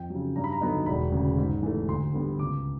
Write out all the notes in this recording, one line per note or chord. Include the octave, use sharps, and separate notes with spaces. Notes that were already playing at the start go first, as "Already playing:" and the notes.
Already playing: F2 G5
C#3 F#3
G2 A#5
B5
A#5
D3 F#3 B3 D#4 B5
E1 B5
D2 C#3
G#2
E3 A3
D2 C6
D3 G3 B3
C#2 D6